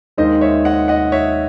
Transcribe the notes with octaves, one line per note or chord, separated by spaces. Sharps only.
D#2 D#3 G#3 D#4 C5 D#5
C#5 E5
D#5 F#5
D#5 F#5
C#5 E5